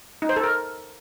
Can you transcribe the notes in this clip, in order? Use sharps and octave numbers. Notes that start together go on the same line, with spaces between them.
D#4
C5
A4
A#4